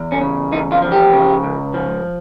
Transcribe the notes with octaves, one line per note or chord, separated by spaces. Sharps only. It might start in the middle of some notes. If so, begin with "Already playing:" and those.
Already playing: E2
C#4
C#3
E2 D#4
F4
F3
G4
C#3
C#2
F3